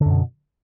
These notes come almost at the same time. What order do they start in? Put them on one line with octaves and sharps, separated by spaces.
D3 F#2 B2